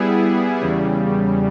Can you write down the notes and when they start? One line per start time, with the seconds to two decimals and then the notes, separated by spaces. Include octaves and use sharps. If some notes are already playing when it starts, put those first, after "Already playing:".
Already playing: G3 B3 E4 G#4
0.61 E2 C#3 G3